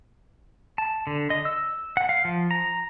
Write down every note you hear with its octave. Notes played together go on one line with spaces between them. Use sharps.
A5
D3
D#5
E6
F#5
F5
F3
A#5